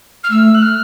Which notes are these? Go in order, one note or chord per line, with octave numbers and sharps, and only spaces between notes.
F6
A3 E6
F#6
F6